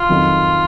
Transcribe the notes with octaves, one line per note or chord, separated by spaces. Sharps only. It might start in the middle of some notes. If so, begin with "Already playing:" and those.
Already playing: F4
F2 D#3 F#3